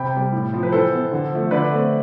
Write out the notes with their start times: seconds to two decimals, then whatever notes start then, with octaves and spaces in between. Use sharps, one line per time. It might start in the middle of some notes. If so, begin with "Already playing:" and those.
Already playing: C3 G5 B5
0.13 G3 C4
0.32 A2
0.53 F3 C4
0.63 B4
0.72 E3 A4 C5
0.92 B3
1.12 D3
1.32 F3 A3
1.51 D3 B4 D5
1.71 A3 C4